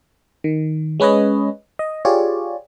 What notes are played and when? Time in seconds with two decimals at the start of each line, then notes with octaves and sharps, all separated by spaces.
0.44 D#3
1.00 G#3 C#4 B4 C#5 D#5
1.79 D#5
2.05 F4 G4 G#4 C#5 D5